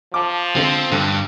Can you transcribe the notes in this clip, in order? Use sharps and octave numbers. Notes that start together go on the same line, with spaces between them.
F3 A5 D6
D3 G#3 C4 D7
G2 D3